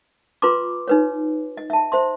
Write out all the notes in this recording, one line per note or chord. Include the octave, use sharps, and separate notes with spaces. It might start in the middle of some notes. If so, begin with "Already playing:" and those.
F4 B4 A#5 C6 D6
D#4 B4 C#5
D#5
E5 A5
C5 E5 C6